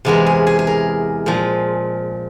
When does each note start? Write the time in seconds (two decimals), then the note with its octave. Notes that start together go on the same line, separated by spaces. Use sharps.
0.05 E2 C3 E3 G#3 A#4
0.26 G#4
0.47 G#4
0.59 G#4
0.67 A#4
1.26 A#2 F3 G#3